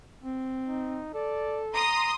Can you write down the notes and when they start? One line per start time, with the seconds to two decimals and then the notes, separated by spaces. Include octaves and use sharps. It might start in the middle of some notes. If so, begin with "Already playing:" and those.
0.23 C4
0.68 D#4
1.14 A4 D5
1.75 A#5 C6 D#6